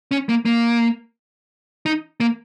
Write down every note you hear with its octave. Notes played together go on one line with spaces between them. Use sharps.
C#4
A#3
A#3
D#4
A#3